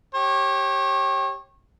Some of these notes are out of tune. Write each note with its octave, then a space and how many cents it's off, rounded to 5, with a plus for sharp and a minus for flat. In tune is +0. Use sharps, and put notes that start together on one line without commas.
G4 -10 C#5 -35